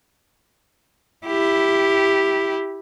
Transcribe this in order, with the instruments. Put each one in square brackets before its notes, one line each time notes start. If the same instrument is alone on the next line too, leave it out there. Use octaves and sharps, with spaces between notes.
[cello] E4 G4